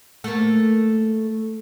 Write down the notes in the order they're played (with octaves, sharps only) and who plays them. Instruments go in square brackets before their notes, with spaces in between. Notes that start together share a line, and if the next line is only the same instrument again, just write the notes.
[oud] A3 A#3